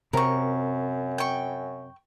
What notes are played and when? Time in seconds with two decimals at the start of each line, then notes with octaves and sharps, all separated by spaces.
0.13 F#2 C3 C4 A#4 C#6
1.18 G5 C#6